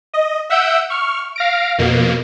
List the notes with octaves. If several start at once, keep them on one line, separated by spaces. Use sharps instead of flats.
D#5
E5 F#5 E6 G6 D7
C#6 F6
F5 A#6 D7
F2 B2 A#3